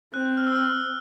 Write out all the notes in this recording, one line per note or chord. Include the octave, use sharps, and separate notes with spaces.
C4 F#6
F#6
F6
E6
F6